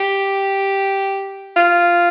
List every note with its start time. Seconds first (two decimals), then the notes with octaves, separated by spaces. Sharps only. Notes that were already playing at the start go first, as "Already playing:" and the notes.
Already playing: G4
1.57 F4